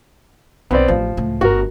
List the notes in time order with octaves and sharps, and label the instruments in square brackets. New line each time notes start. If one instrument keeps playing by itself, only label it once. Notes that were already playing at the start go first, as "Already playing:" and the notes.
[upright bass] B1 E4 [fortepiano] B3 C4 D5
[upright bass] A1 [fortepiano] F3
[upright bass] C#2 A2
[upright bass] G1 [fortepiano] F#4 A#4